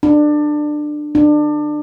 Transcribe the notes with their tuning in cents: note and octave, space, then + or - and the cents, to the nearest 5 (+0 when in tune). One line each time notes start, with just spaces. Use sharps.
D4 +20
D4 +25